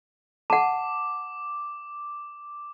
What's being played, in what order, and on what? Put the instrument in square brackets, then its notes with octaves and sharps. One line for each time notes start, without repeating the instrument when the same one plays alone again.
[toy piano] F#5 A5 [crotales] D6